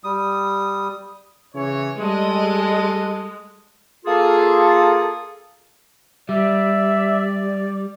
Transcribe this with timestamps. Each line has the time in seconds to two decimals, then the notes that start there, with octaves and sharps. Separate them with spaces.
0.04 G3 D#6
1.53 C#3 E3 C#5
1.99 G3 G#3 A4 D#5
4.05 A#3 F4 G#4 A4
6.29 G3 D5 E5